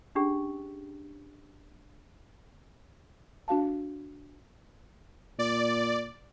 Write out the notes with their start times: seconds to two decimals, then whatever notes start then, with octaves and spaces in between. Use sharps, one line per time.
0.15 C#4 D4 G4 G#4
3.48 D4 F#4 F5 A5
5.39 A#2 D5